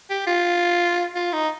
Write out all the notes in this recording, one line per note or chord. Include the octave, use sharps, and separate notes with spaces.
G4
F4
F4
D#4